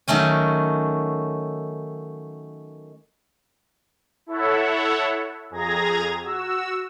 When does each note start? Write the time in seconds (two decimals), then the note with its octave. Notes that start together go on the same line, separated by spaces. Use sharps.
0.08 D#3 F#3 A3 C#4 G#5
4.26 E4 A4 C#5 E5 F#5
5.50 F2 G#4 A#5 G#6 A#6
6.22 F#4 E6